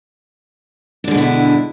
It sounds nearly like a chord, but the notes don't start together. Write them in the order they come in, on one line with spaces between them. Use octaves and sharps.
D4 D3 G#3 B2 E4